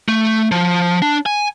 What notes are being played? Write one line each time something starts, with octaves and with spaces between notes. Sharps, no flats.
A3
F3
D4
G#5